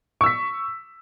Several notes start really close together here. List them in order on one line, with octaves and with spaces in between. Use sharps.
C#6 E6 B6